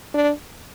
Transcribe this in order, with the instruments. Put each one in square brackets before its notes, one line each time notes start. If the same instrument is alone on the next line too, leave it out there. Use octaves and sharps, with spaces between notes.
[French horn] D4